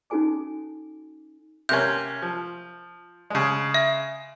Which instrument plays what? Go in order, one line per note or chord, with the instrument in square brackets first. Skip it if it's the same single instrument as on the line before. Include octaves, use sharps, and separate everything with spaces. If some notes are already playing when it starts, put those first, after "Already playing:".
[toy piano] C#4 D#4 F#4 A4 G#5 D6
[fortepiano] C3 A#3 C#4 [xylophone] G6
[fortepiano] F3
C#3 G#3
[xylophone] E5